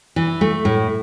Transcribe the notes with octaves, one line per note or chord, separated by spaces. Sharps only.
E3
A3
A2